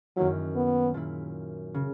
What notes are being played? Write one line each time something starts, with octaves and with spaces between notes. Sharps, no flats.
F#2 D#3 F#3 A#3 E4
B3
A#2 A#3 E4
C#3